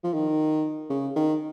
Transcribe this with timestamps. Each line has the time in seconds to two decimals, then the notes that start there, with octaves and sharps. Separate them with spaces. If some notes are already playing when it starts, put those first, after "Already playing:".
0.04 F3
0.14 D#3
0.90 C#3
1.16 D#3